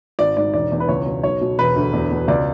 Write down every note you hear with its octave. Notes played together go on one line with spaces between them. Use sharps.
G#1 D5
G#2 D5
E1 D5
E2
B4
C#2 C#5
B2
B1 C#5
B2
E1 B4
D2
E2
B2
C#2 D5